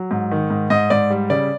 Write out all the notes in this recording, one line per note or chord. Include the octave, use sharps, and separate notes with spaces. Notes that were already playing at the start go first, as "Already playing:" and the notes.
Already playing: F#3
G#2
D#3
G#2
G#2 D#5
G#2 D5
G3
C#3 D5